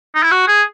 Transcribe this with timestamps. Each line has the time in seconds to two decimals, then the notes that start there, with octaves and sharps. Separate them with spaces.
0.15 D#4
0.23 E4
0.31 F#4
0.48 G#4